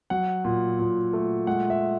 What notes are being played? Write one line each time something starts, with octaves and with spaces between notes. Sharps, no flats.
F#3 F#5
A#2
A#2
A3
G#3 F#5
E5